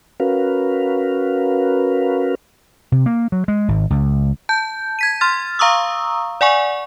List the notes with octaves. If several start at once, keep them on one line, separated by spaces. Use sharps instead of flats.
C#4 F#4 A#4 B4 F5
C3
A#3
F#3
G#3
G#1
C#2
A5 G6
G#6 B6 D#7
C6 F6 A6
F5 A#5 C#6 D#6 E6
D5 F#5 G#5 C#6